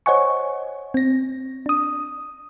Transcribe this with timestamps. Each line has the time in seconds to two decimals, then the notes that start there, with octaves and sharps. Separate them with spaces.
0.06 C5 C#5 D#5 F#5 G#5 C#6
0.94 C4 A#6
1.66 D4 D#6